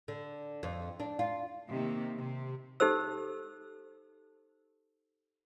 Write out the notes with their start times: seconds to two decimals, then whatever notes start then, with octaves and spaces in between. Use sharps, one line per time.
0.08 D3
0.63 F2
1.00 D4
1.19 F4
1.70 C3 D#3 A#3
2.18 C3
2.80 D#4 G4 A4 C5 E6